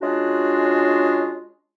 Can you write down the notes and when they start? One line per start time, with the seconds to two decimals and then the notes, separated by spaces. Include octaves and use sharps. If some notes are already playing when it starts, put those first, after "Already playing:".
0.02 G#3 C#4 D4 F4 F#4